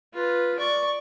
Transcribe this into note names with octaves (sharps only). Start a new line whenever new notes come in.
F4 B4
D5 C#6